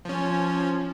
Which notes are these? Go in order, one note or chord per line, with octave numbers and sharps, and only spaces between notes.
F3 C#4